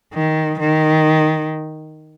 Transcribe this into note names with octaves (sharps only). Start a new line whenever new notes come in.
D#3
D#3